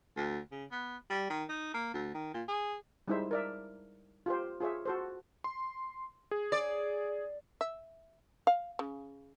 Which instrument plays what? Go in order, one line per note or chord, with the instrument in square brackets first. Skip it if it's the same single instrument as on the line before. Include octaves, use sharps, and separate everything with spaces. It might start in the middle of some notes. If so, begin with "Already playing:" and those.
[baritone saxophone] D2
C#3
B3
G3
D#3
D#4
A#3
D2
D#3
A#2
G#4
[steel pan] G3 G#3 D#4 E4 C5 E5
A#4 D5 E5
F4 G4 C5
F4 G#4 C#5 E5
F#4 A4 C5
[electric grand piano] C6
G#4
[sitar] D5
[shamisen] E5
F5
C#3